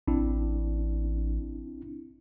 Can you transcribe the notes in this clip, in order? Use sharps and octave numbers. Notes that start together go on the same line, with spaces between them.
A1 C4 D4 E4